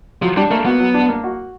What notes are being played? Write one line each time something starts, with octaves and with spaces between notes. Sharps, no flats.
F3 F#3
G3 D4
A3 A#3
B3 F#4
F#3
D4
A#3
F#4